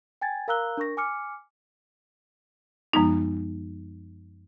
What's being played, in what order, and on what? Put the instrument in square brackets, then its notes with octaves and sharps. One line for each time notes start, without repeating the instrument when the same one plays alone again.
[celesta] G5 G#5 G#6 A6
A#4 F5 A#5 E6 F#6 G7
D4 A#4 C#6 A#6
G#5 D6 F6 C#7
[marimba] F#2 F3 G#3 B3 D#4